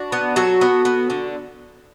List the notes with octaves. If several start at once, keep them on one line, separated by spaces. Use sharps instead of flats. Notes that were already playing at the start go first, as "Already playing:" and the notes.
Already playing: D4 F#4
B3
F#3 F#4 A4
B3
B3
D3